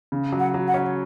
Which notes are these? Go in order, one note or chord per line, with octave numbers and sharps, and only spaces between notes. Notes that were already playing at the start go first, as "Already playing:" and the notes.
C#3
F#3
F#5
F#3
F#5
C#4